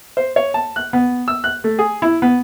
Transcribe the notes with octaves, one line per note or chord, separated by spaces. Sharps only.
C5
C#5
A5
F#6
B3
E6
F#6
A3
G#4
E4
B3